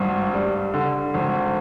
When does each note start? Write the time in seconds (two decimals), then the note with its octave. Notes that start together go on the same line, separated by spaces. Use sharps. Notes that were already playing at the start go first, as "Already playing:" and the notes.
Already playing: G#1 G2
0.34 G3
0.74 D3
1.14 G#1